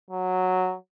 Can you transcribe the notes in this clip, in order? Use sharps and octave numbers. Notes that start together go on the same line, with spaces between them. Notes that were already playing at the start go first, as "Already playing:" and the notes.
F#3